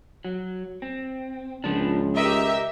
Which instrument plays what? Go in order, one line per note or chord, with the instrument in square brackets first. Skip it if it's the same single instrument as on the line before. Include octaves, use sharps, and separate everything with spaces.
[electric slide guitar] F#3
C4
[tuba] C#2 [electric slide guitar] F3 D4
[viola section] G4 E5 [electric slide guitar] A#4 D#5